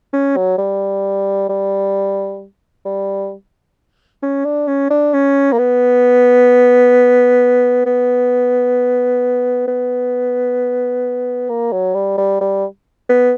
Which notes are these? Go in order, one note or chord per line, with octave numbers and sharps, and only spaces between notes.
C#4
F#3
G3
G3
G3
C#4
D4
C#4
D4
C#4
A#3
B3
B3
B3
A#3
F#3
G3
G3
G3
B3